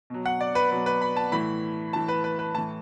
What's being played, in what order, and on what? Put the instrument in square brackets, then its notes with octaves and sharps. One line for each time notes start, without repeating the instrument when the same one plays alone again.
[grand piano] B2 F#3
F#5
D5
B4
B2 F#3 B4
B4
B5
A5
A2 E3 B5
A2 E3 A5
B4
B4
B4
A2 A5
E3